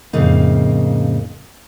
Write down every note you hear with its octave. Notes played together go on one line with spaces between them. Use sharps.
F2 A2 C#3 A#3 D#4